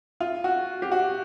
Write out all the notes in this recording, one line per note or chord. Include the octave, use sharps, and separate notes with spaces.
F4
F#4
G4
F#4